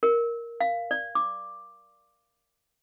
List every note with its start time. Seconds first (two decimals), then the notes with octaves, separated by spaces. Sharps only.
0.03 A#4
0.60 F5
0.91 D5
1.15 D6